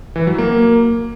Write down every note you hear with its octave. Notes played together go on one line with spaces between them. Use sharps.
E3
F#3
A#3